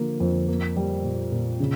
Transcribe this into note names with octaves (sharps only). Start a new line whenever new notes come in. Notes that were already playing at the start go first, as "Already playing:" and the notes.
Already playing: D3 F3 A#3
F2
A#3
G3
A#2
A#2
C#3